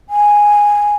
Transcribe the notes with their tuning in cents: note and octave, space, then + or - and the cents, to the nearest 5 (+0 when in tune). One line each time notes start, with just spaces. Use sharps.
G#5 -5